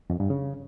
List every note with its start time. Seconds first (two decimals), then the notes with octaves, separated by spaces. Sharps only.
0.10 F2
0.20 G2
0.30 C#3